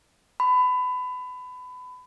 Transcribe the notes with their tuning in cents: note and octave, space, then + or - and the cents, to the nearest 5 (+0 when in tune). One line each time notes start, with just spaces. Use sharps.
B5 +25